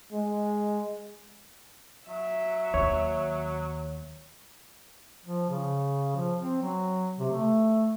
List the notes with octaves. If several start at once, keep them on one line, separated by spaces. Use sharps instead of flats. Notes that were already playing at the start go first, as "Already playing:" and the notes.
G#3
F#3 E5
D#2 C#5
F3
C#3
F3
C4
F#3
C3
A3